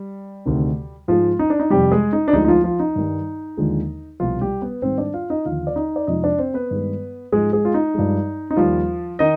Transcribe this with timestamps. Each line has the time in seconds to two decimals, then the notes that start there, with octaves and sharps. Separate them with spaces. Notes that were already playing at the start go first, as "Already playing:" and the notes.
Already playing: G3
0.46 D2 C3 D#3
1.08 G#2 F3 G#3 F4
1.39 D#4
1.50 D4
1.60 D#4
1.70 F2 C3 G3 G4
1.92 G#3 G#4
2.13 D#4
2.28 D4
2.33 D2 D3 F3 G#3 D#4
2.45 D#4
2.48 F3 F4
2.64 F3 F4
2.80 D#4
2.95 G2 D#3 G3
3.57 D#2 D3 F3 G#3
4.20 C2 B2 F3 G3 F4
4.41 G3 G4
4.62 B3 B4
4.82 G#2 D#3 G3 C4 C5
4.98 D4 D5
5.14 F4 F5
5.30 D#4 D#5
5.45 D#2 D3 F3 F4 F5
5.67 D5
5.76 D#4 D#5
5.96 D5
6.07 F2 C3 F3 G#3 D#4 D#5
6.24 D4 D5
6.38 C4 C5
6.54 B3 B4
6.71 G2 D#3 G#3
7.32 G#2 F3 G#3 G#4
7.53 G#3 G#4
7.65 F4
7.74 D#4
7.94 G2 F3 G#3
8.51 D#4
8.57 D#2 D#3 F3 G3 F4
9.19 D#3 D#4 D#5